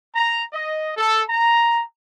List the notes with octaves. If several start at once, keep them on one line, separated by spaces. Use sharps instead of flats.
A#5
D#5
A4
A#5